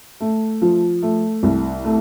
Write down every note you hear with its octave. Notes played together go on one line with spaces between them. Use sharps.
A3
F3
A3
C2
A3